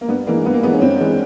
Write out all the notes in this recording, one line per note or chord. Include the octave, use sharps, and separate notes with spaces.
A#3
G2 B3
E3 G#3 A#3
G2 B3
A#3
E3 G#3 B3
C#4
G2 C4
E3 G#3